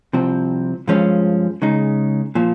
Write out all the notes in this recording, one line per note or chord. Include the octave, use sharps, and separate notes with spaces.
C2 C3 F3 C4
G2 F3 G#3 C#4
C#3 G#3 D#4
A#2 F3